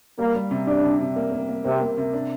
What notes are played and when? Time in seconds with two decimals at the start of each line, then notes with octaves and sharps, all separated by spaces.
0.18 G3 A#3
0.35 G3
0.51 C3
0.67 D4 G4
0.83 C3
1.00 C3
1.16 A#3
1.32 A#3
1.49 A#3
1.64 C3 A#3
1.81 A#3
1.97 C3
2.13 D4